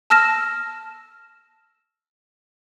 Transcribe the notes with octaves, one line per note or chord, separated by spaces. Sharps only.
A5 E6 F6 A#6 E7